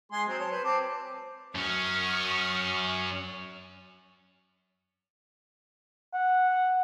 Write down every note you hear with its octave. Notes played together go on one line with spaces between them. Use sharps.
G#3 G#4 C6
F#3 C4
C#5 A5
B4 C5
C4 A5 D6
F#2 C#4 C#6 D#6 F6
F#5